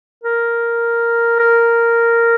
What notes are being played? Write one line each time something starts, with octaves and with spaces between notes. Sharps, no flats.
A#4
A#4